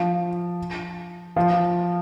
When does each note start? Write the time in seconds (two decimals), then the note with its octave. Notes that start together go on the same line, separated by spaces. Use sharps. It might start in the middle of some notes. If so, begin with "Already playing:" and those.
Already playing: F3
1.36 F3